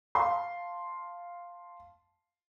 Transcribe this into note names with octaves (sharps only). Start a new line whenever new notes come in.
F5 A5 C6